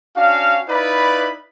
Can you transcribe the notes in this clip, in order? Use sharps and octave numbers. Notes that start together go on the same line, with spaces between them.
C#4 D4 F#4 F5
D#4 E4 B4 D5 F5 B5